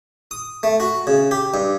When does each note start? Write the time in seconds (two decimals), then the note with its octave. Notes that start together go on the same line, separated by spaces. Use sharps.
0.31 D#6
0.63 A3
0.80 F#4
1.07 C#3
1.31 G4
1.54 G2